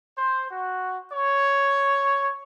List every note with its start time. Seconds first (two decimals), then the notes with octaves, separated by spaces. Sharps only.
0.18 C5
0.50 F#4
1.13 C#5